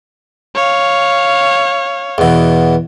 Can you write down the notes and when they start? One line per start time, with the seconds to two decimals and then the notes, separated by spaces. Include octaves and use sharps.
0.55 C#5 F5
2.18 E2 B2